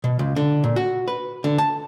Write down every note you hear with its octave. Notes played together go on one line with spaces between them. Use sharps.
B2
C#2
D3
A#2
F#4
B4
D3
A5